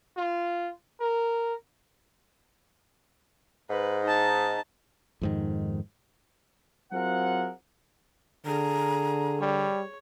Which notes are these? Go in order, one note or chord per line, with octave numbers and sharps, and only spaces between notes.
F4
A#4
G#2 B4
D#4 A5
F2 G#2 D#3
F#3 C4 F4 G#4 A#4 F#5
D3 G#4 A#5
G3 C#5